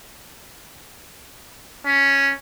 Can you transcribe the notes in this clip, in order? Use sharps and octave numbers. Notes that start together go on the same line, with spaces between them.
C#4